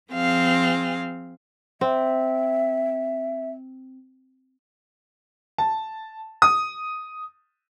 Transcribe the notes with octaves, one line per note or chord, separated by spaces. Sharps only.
F3 C4 G#4 F5
C4 E5
A5
D#6